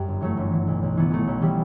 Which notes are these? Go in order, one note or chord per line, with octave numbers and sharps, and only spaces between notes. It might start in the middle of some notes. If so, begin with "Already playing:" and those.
Already playing: F#2 G3
G1
E3 F#3 A3
G1
E3
B1
B1
E3 B3
E3 F#3 A3
B1
E3 G3